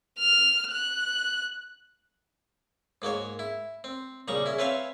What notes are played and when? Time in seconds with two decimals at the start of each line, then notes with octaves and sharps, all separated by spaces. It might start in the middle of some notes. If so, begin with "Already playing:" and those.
0.19 F6
0.72 F#6
3.02 G#2 A#3 F#4 C#5
3.39 E4
3.84 C4
4.28 A#1 C#3 G3 A#5 C#6
4.46 C#4 E4
4.58 C4 C#4 B4 C#5 E5 F5